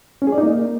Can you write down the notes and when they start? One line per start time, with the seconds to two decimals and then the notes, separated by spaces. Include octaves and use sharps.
0.22 C#4
0.27 G#4
0.32 D5
0.38 D#4
0.43 A#3